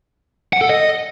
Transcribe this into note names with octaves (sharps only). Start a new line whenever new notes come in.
F#5
A4
D#5